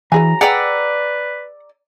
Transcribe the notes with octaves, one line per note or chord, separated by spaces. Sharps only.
E3 F#3 G#4 G#5 A#5
G#4 B4 D5 F#5 G5 A#5 E6